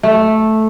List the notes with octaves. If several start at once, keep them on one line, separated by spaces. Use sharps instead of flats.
A3